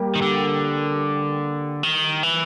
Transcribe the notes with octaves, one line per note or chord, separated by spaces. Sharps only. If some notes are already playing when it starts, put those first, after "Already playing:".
Already playing: G3 A#3 G4
D#3
D3
D#3
E3